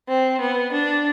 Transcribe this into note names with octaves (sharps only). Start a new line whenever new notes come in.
C4
B3
D4